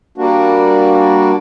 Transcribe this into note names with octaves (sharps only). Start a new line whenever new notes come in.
G3 A#3 D4 F#4